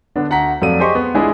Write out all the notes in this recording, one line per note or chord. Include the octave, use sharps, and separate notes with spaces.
D3 B3 D4
D2 F#5 A#5 B6
F2 F#3 A4 D5 F5 D#7
G4 G#4 C5 D#5 C6 C#6
B3
A1 G#3 D4 E4 F4 G#4